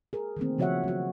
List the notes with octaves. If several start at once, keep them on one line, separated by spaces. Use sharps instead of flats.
G#4 A#4
D#3 E3 A3 A#3 C4
C#3 F3 F#4 C#5 E5 F#5
F#3 F#4